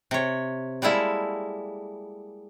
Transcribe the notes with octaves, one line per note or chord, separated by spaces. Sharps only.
C3 C#5
G3 G#3 A#3 E4 A4